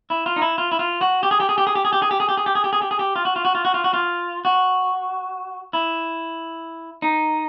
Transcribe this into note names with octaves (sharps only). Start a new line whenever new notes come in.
E4
F4
D#4
E4
F4
E4
F4
F#4
G4
G#4
G4
G#4
G4
G#4
G4
G#4
G4
G#4
G4
G#4
G4
G#4
G4
G#4
G4
G#4
G4
G#4
G4
F4
F#4
F4
F#4
F4
F#4
F4
F#4
F4
F#4
E4
D#4